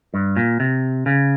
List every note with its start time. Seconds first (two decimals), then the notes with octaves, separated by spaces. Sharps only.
0.14 G2
0.37 A#2
0.60 C3
1.06 C#3